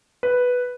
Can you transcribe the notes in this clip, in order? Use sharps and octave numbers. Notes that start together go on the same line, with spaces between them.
B4